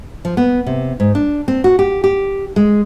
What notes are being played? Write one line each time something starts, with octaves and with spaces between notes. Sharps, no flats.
F3
B3
C3
G#2
D4
C4
F#4
G4
G4
G#3